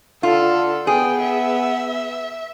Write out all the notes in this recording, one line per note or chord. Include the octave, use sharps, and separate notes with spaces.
D3 F4 A4
B3 G#4 G5
E5